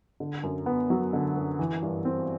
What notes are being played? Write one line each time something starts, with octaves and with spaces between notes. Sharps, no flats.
D3
F#2
B3
F#3
D3
F#2
E3
G2
C4